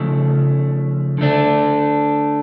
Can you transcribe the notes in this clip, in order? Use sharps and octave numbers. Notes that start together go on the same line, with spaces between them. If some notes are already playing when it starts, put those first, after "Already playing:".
Already playing: C#3 F3 A3
D3 A3 D4